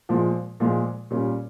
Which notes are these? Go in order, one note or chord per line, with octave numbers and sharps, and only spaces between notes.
A#2 F3 G#3
A#2 F3 G#3
A#2 G3 C#4